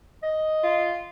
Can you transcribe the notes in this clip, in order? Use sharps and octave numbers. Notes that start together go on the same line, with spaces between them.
D#5
F4